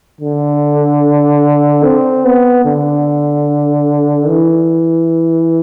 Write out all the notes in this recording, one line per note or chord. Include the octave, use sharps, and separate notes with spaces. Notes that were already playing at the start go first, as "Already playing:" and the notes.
D3
C4
B3
D3
E3